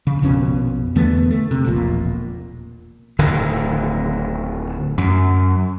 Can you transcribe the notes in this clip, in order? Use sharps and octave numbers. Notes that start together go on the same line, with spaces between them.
C#3
A#1 F2 B2 C#4
E2 D3 A3 B3
A3
C3
E1 A#1 A#2
D1 D3 D#3
F#2